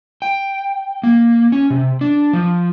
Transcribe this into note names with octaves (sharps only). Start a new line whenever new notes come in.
G5
A#3
C#4
C3
D4
F3